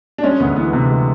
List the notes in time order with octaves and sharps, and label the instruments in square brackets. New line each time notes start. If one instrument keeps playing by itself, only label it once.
[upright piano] D4
[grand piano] G#3 [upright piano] C#4
[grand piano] D2 [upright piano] B3
[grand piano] E3 [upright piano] B3
[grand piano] C3 [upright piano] B3
[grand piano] G#3